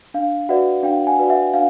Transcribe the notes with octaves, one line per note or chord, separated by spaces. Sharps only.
D4 F5
F#4 B4 D5 E5 F#5
D4 F5 G5
F#5 G#5
F#4 B4 D5
E5 F#5
D4 F5